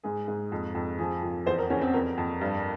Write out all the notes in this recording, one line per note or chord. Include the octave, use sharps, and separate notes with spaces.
G#2 G#4
G#2
F2
F2
F3 G#4
F2
E2 C5
A#4
E2 C#4
C4
F2 A#4
F2
G2